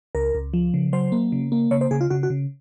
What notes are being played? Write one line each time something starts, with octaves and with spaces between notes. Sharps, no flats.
C#2 A#4
C#2
F3
C#3
F#3 C5
A#3
C#3
A#3
C#3 C#5
C5
C#3 G#4
F4
C#3 F#4
F#4
C#3